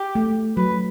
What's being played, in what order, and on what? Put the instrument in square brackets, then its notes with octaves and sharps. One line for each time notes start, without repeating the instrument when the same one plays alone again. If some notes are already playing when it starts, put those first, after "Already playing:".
Already playing: [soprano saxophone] G4
[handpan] A3
[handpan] F#3 [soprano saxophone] B4